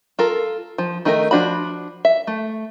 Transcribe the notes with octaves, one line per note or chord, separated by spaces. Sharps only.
F4 A4 A#4
F3
D#3 A3 D4 D#4 A#4
F3 D4 F#4 B5
E5
A3